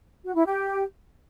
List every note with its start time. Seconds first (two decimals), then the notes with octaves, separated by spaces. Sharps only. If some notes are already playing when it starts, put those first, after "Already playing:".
0.25 F#4
0.35 E4
0.46 G4